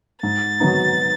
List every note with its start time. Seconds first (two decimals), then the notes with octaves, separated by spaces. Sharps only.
0.23 G#2 A6
0.60 D#3 F#3 B3 D#4